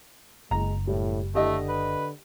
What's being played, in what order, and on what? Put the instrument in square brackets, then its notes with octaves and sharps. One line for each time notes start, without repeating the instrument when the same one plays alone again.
[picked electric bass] F#1 [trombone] G#3 [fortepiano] A#5
[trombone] A2 [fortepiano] G3
[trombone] D3 [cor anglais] A3 [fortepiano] G4 D#5
[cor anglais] B4